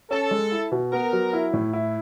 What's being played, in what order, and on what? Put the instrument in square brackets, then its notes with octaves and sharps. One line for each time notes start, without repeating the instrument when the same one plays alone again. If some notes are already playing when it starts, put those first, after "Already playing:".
[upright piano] C#4 [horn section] A4
[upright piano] G#3
E4
B2
[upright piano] B3 [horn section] A#4
[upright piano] F#3
E4
A2
E4